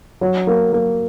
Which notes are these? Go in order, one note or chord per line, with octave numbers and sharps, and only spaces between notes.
F#3
A#3
A#3